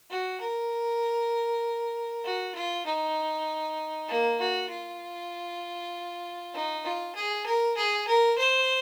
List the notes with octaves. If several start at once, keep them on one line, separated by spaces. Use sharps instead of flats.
F#4
A#4
F#4
F4
D#4
A#3
F#4
F4
D#4
F4
G#4
A#4
G#4
A#4
C5